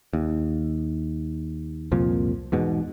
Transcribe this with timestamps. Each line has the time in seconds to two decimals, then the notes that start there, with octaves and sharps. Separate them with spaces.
0.13 D#2
1.92 C2 F2 A#2 F3
2.52 E2 G#2 B2